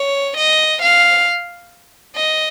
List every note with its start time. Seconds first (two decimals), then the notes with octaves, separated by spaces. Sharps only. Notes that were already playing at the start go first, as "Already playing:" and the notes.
Already playing: C#5
0.37 D#5
0.82 F5
2.16 D#5